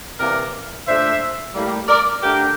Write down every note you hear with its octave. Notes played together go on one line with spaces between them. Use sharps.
C3 E3 A#3 A#4 D5
A#2 A3 D4 C5 E5
A2 G3 A#3
A#4 D5
D3 A3 D4 G4 A#4